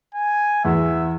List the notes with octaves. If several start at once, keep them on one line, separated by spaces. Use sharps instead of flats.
G#5
E2 E5